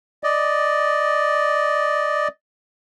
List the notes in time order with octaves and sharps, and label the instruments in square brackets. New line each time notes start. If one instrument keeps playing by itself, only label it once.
[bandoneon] D5 D#5